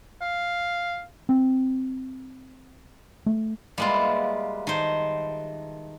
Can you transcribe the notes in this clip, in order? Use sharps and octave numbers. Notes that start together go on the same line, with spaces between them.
F5
C4
A3
G3 G#3 A#3 E4 F4 B4
D#3 C5 A5